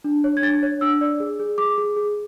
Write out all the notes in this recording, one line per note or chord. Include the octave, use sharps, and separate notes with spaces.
D4
C#5
G#6
D4 A6
C#5
D4 E6
D5
G#4
G#4
G#4 D6
G#4
G#4